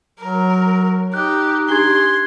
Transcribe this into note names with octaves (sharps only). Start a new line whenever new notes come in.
F#3 A#4
D#4 G4 F#6
D4 G4 C6 G#6 G7